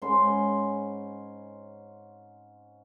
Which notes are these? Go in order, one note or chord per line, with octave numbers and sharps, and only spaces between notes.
G#2 C#4 B5 C6